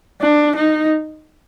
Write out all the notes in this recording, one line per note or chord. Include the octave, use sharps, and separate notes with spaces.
D4
D#4